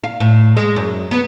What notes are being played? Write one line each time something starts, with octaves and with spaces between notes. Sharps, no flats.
F5
A2
G#3
F#2
B3